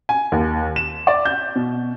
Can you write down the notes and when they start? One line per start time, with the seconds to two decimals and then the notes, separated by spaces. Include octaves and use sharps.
0.09 G#5
0.32 D#2
0.76 E7
1.07 D5
1.25 G6
1.56 B2